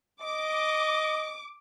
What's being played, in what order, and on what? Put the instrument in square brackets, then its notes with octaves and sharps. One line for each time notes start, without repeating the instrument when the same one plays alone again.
[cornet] D#5 [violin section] D6